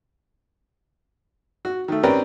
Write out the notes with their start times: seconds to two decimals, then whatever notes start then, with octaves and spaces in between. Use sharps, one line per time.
1.65 F#4
1.88 D#3 A3
2.03 C4 C#4 G4 A#4 B4 D5